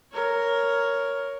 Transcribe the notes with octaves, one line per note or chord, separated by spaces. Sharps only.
A#4 C#5